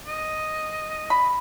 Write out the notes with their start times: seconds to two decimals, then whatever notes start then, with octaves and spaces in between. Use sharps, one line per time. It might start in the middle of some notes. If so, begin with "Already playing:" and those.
0.06 D#5
1.10 B5